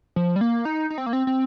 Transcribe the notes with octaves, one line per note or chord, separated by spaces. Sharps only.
F3
G3
A#3
D#4
D#4
C4
A#3
C4
C4